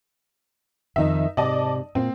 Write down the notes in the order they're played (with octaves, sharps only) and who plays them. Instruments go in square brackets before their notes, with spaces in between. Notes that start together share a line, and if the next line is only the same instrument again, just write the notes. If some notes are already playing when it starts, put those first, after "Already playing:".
[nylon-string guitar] F2 D#3 [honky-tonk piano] D#4 E5
[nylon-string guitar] G#2 C3 [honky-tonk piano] D5 D#5 A5
[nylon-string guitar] A#2 [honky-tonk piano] C4